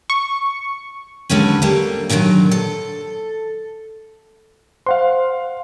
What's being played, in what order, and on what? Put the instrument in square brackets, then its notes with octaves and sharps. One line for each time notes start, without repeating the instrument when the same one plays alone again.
[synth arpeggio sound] C#6
[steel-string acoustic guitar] D#2 D3 G#3 C#4 B4
G3 A3 A#3
A#2 D3 D#3 F3 F#3
A4
[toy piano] C5 [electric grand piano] F5 F#5 C6